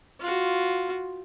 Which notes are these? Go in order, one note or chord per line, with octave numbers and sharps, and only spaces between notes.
F4 F#4